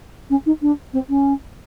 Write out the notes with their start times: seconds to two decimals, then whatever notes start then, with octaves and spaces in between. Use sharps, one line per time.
0.30 C#4
0.46 D#4
0.61 D4
0.93 C4
1.09 C#4